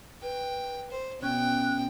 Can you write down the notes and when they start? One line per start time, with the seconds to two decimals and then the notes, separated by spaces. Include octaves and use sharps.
0.22 B4 G5
0.91 C5
1.22 B2 C#4 G5 F#6